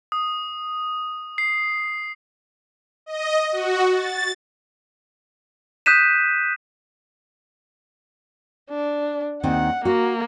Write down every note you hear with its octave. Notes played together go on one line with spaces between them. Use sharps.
D#6
C7
D#5
F#4
A6
D#6 F#6 G6 B6 D#7 E7
D4
D#2 D#3 C4 F#5
A#3 F#4